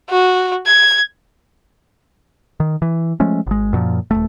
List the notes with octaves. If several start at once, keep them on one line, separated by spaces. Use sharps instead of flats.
F#4
G#6
D#3
E3
F3 G#3 A3 C#4
G#1 G#3
F#2 A#2 F3
D#1 G#1 A3